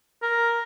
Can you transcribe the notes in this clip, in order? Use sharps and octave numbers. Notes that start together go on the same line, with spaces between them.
A#4